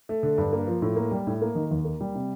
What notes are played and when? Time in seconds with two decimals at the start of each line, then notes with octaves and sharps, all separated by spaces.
0.09 A3
0.23 D3
0.38 G2
0.53 A#3
0.67 F3
0.82 A2
0.96 A#3
1.11 G3
1.27 A2
1.42 A#3
1.55 D#3
1.71 D#2
1.85 A#3
2.01 G3
2.15 C3